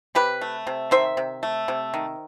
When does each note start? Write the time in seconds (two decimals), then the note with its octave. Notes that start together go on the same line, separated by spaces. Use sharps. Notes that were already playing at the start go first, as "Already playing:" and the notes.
0.15 C3 G4 B4
0.41 A3
0.67 C3
0.91 D#3 C5 E5
1.17 C3
1.43 A3
1.68 C3
1.94 D#3